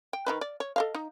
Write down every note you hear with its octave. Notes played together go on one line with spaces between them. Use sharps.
G5
D#3 D#4 B4
D5
C#5
A4 D#5 F5
D#4